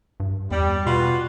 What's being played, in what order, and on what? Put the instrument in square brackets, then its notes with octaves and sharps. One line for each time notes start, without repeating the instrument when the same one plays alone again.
[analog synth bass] G2
[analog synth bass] E2 [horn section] G3
[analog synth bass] B2 [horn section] F4 F#4 B4